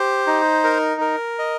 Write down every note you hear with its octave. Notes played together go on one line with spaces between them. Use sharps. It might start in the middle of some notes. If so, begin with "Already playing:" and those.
Already playing: G4 C5
D#4
A#4
A#4
D#5